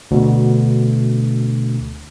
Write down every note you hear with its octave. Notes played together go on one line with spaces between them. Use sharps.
D2 B2